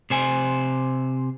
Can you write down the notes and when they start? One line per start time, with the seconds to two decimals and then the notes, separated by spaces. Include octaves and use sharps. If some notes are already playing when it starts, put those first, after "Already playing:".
0.10 C3 C5 G#5